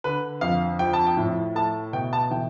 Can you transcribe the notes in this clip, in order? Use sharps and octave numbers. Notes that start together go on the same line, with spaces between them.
D3 B4
F2 F5
F3 G5
A5
G5
A2
A3 A5
B2 G5
A5
E3 G5